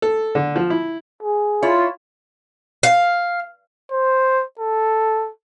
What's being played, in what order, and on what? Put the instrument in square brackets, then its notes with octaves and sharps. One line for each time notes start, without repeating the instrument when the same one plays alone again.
[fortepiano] A4
D3
F3
E4
[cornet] G#4
[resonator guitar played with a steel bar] E4 C#5 [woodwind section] F4
[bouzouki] F5
[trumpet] C5
A4